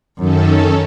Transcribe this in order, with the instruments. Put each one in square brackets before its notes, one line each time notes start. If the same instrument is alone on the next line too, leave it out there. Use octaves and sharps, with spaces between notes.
[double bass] F#2 [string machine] D#3 C#4 A4